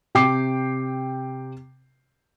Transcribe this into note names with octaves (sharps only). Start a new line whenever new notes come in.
C3 G5 D6 C7